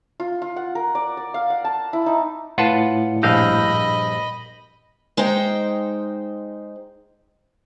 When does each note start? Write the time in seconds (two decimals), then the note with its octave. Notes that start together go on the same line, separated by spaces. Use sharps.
0.20 F4
0.42 F4
0.56 F#5
0.75 A#4
0.95 D5
1.17 D5
1.34 F5
1.50 F#5
1.65 A5
1.93 E4
2.06 D#4
2.58 A2 F4 B4 F#5 A5 C#7
3.23 A#1 G2 D#5 F5 B5 E6 G6 A#6
5.17 G#3 D#4 C5 G5